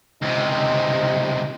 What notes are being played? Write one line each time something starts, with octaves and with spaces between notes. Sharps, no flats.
C#2 C3 D#4